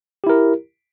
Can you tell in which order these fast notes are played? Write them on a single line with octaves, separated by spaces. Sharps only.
G4 E4 A#4